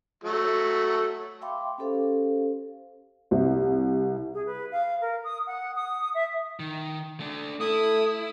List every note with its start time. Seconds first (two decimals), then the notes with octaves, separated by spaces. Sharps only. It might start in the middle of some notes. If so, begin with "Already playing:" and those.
0.24 F#3 A3
1.41 E5 F5 G5 B5 C6 D6
1.78 C#4 G4 A4 C5 F5
3.31 C2
4.34 G#4
4.46 B4
4.72 F5
5.01 A#4
5.24 D#6
5.47 F#5
5.76 D#6
6.14 E5
6.60 D#3
7.20 A3 D4
7.60 A3 E4 D#6